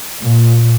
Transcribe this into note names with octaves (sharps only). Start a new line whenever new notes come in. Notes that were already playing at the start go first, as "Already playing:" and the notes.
A#2